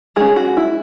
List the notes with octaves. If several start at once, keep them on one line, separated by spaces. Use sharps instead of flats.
G#3 C#4 G#4
F#4
E4